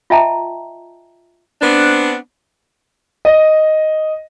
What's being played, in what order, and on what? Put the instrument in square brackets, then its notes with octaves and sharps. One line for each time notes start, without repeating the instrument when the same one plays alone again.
[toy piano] F4 D#5 E5 G5 A5 A#5
[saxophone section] B3 C4 D4
[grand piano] D#5